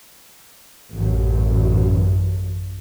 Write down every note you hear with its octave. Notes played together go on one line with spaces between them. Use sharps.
A1 F#2